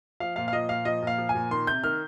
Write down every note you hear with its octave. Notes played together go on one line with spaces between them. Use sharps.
F3 F5
A#2 F5
F5
F3 D#5
A#2 F5
F3 D#5
A#2 F5
F3
G#5
A#2
D#3 C6
C3 G6
D#3 F6